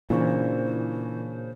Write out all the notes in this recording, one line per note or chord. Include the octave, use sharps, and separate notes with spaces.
A#2 C#3 E3 D4 C5 C#6